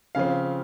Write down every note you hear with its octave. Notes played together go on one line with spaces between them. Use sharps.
C#3 F3 C4 F5